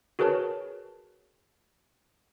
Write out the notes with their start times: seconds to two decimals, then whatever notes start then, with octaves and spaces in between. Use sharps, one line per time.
0.19 F#4 G#4 A#4 B4 C#5 A5